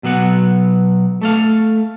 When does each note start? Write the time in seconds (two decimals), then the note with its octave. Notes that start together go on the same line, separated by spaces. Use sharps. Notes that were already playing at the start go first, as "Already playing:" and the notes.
0.03 B2 F#3 B3 F#5
1.22 A3 A4 F5